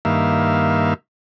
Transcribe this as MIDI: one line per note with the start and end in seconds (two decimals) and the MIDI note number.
0.05 0.94 43
0.05 0.94 51
0.05 0.94 58
0.05 0.94 76
0.05 0.94 77